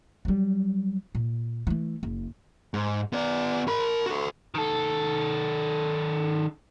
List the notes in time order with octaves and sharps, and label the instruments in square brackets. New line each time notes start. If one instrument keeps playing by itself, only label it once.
[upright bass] F#3 G3
A#2
E3 A3
F#1
[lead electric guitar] G#2
B3 D5
A#4 B5
F#4 A4
[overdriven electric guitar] D#3 A4